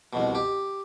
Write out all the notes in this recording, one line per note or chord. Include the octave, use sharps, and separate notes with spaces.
C2 F2 B2
G4